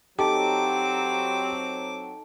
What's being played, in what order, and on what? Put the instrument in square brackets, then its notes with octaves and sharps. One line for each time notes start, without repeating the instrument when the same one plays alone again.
[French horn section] F#3 C4 [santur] D#4 A4 [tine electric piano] G4 [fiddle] D6